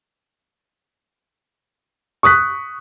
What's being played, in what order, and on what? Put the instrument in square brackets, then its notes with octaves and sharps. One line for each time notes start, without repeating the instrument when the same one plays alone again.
[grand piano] C#6 D#6 F#6 B6